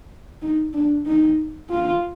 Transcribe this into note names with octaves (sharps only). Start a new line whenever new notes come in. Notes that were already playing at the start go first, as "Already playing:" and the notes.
D#4
D4
D#4
F4